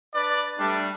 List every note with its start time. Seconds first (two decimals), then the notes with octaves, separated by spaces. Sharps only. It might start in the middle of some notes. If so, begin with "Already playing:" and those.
0.14 D4 B4 D5
0.59 G3 A3 D4